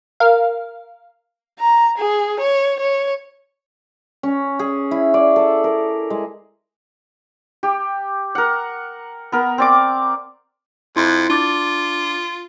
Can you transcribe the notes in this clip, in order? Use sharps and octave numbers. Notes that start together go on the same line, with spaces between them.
A#4 F5
A#5
G#4
C#5
C#5
C#4
G#4
E4
D5
A4
A#4
G#3
G4
A#4 F#5
B3 A#4
C4 D5 D6
F2 E4 C6
D4 F4 D6 A6